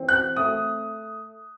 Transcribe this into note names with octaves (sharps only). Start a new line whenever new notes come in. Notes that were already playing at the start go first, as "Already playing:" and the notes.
Already playing: E3 C4
F#6
A3 D#6